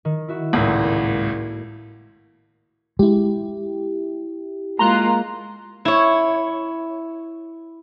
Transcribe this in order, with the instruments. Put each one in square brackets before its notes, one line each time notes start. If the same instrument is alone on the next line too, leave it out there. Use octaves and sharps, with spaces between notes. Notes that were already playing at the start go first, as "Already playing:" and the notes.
[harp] D#3
E4 F#4 E5
[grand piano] G#1 C#2 [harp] A2 A3 A#3
[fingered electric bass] G#3 [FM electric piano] E4 G4
[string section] G#3 A#3 F4 [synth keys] A#5 C6 F#6
[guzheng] E4 C#5